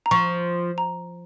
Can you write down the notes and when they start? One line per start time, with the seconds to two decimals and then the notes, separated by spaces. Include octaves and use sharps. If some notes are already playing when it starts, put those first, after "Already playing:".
0.06 A#5
0.11 F3 C#6
0.78 A#5